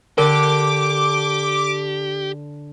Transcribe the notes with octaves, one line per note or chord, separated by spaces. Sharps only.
D3 G4 A#4 D6